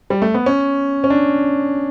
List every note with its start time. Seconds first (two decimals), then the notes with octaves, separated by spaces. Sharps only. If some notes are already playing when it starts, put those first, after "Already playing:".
0.10 G3
0.22 A3
0.34 B3
0.46 C#4
1.04 C#4
1.10 D4